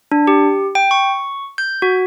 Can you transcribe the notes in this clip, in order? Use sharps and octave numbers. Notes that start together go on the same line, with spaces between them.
D4
G4
G5
C#6
G6
F#4